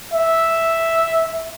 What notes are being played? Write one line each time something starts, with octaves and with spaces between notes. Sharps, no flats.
E5